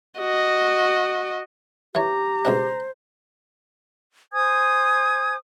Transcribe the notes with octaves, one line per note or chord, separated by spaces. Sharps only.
F#4 D#5
E3 G4 C#5 A#5
C#2 B2 D4 C5
C5 G#5 D#6 G#6